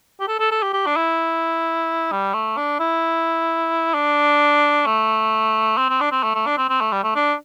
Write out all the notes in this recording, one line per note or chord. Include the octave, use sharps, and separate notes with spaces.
G4
A4
A4
A4
G4
G4
D4
E4
G3
A3
D4
E4
D4
A3
C4
C4
D4
C4
A3
A3
D4
C4
C4
A3
G3
A3
D4